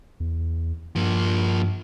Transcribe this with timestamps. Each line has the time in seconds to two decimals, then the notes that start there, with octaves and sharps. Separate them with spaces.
0.20 E2
0.95 G2 F3 A#3